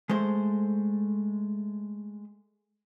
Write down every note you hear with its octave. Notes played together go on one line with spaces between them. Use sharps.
G#3 A3 C5